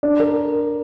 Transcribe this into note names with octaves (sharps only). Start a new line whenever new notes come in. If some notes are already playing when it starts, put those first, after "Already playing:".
D4 D5
A#4